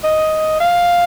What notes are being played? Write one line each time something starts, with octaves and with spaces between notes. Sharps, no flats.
D#5
F5